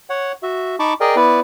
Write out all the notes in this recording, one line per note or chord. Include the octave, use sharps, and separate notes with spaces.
C#5 F#5
F#4 E5
D#4 A5 B5 C#6 D6
G#4 A#4 D5 D#5 G5
B3 E4 B4 D5